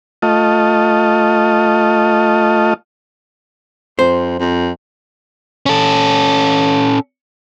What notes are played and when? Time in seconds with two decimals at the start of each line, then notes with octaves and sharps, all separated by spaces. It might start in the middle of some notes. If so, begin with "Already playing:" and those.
0.22 A3 F4 D#5
3.99 F2 C5
4.39 F2
5.66 C#4 A4